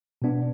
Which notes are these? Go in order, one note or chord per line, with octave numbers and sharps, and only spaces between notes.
B2 B3 D4